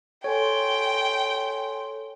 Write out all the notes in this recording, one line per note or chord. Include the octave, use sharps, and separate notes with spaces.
A4 C#5 G5 G#5 C6